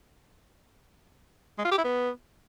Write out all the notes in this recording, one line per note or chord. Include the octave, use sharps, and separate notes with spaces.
G#3
F4
G4
E4
B3